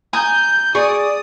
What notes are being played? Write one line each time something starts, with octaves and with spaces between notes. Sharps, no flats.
G#5 A#5 D#6 G6
G#4 D5 C#6 D#6